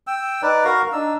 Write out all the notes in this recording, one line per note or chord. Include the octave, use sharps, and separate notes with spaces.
G5 E6
D#4 B4 D5
F#4 A#4 F5 A#5
D4 D#4 E6